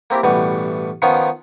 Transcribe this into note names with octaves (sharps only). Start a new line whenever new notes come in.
A#3 C4 E4 G4
A1 B2 E3 G3
D#3 F3 B3 C#4 F4